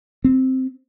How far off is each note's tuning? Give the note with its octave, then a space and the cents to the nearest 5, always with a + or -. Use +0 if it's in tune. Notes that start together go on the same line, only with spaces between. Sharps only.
C4 -5